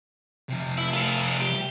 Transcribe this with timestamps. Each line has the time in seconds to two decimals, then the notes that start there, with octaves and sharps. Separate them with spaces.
0.49 C3 F3
0.78 E4
0.93 A3 F4
1.40 G4